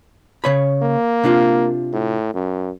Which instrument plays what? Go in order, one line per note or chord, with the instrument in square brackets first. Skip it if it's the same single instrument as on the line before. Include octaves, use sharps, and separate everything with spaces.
[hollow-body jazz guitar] C#3 C#5 B5
[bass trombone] A#3
[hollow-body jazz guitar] C3 D4 F4
[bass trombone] A2
F#2